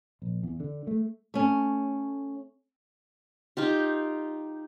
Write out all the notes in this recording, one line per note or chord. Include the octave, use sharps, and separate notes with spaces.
A#1
E2
D3
A3
A3 C#4
D#4 F4 G4